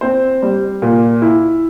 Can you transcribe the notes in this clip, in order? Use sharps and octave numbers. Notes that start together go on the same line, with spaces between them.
C4 C5
G3
A#2
E4